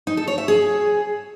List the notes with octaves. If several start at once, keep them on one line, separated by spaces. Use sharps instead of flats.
D#4
A4
C#5
E5
G#4